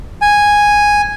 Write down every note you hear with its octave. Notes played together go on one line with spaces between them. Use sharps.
G#5